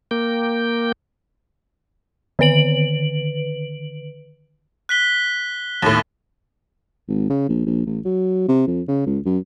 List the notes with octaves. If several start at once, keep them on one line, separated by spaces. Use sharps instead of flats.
A#3 G5
D3 D#3 B4 D7 F#7
F#6 B6 G7
D#2 A2
G#1
C#3
A#1
A#1
A1
F#3
C3
F2
C#3
C#2
F#2